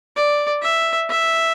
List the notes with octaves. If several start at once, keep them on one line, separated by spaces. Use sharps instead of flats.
D5
E5
E5